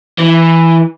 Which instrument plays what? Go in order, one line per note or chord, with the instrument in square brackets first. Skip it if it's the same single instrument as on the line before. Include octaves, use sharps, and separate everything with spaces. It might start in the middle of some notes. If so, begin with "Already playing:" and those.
[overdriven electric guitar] E3